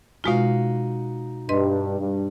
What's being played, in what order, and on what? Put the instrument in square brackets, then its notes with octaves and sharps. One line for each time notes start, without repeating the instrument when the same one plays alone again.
[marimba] B2 G#3 F4 [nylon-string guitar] D#4 F#4 F5
[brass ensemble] G2 [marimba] B4 D#5 C6
[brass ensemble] G2